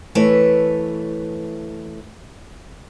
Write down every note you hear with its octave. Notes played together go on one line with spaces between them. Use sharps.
E3 A3 B4 C#5